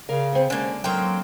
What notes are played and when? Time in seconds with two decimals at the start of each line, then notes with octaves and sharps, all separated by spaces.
0.09 C#3 A#4 D5 F5
0.33 B3 C4
0.50 D3 G#3 A#3 C#4 D5
0.84 G#2 D3 F#3 A#3 C4 G5 A#5